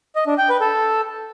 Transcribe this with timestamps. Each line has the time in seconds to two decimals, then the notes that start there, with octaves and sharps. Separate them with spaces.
0.15 D#5
0.27 D4
0.38 G5
0.49 B4
0.61 A4